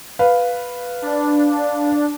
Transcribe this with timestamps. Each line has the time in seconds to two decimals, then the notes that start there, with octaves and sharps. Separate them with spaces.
0.19 B4 F5
1.02 D4